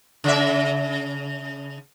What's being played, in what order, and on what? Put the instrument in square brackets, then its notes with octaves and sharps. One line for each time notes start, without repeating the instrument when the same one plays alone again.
[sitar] C#3 E5